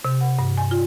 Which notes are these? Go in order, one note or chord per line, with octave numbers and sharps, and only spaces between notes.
C3
F#5
G2
G#5
F4